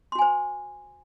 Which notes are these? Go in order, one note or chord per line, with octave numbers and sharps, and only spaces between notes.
F#4 C5 G#5 C6